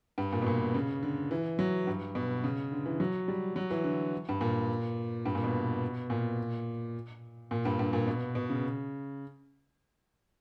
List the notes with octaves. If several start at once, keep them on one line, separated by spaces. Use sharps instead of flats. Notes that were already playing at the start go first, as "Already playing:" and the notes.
G2
A#2
B2
A#2
C#3
D3
E3
F#3
G2
B2
C#3
D3
E3
F#3
G3
F#3
E3
D3
G2
A#2
G2
A#2
B2
A#2
A#2
G2
G2
A#2
B2
B2
C#3